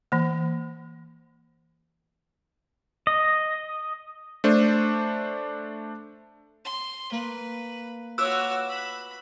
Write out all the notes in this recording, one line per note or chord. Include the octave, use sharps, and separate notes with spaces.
E3 A#3
D#5
A3 D4 C5
C6
A#3 B4
F4 F#4 B4 C#5 D6 E6 F#6 E7
B5